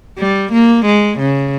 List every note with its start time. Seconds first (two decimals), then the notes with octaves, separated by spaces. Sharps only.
0.19 G3
0.52 A#3
0.86 G#3
1.19 C#3